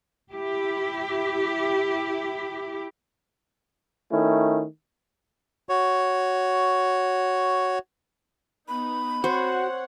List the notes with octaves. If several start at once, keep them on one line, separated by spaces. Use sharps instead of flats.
E4 G4
D#3 A3 C#4 E4
F#4 C#5
B3 D#4 B5
C4 F#4 C5 C#5 F#5